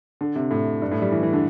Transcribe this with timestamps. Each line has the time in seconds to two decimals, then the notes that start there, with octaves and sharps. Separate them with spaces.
0.21 D3
0.36 C3
0.51 A2
0.82 G2
0.92 A2
1.02 G3
1.12 E3
1.23 E3
1.33 D3